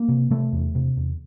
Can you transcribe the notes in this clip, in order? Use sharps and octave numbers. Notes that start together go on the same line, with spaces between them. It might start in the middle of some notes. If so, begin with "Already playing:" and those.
Already playing: A#3
C3
C3 A3
E2
C3
E2